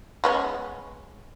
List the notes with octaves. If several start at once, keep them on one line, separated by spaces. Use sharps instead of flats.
G#3 B3 C#4